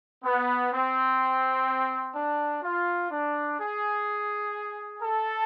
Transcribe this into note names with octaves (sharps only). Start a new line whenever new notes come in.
B3
C4
D4
F4
D4
G#4
A4